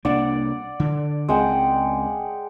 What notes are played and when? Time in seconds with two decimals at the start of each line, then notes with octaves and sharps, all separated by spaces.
0.05 C2 A#3 D4 D5 F#5
0.80 D3
1.29 C#2 G#3 C4 F#5 G5